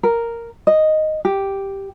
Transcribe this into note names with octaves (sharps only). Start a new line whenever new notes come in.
A#4
D#5
G4